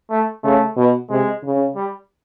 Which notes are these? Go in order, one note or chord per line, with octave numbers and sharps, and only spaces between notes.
A3
C#3 A3
B2
C3 G#3
C#3
G3